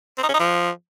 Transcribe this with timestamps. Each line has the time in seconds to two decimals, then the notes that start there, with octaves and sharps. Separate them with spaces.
0.18 C4
0.23 D#4
0.29 C#4
0.34 D#4
0.40 F3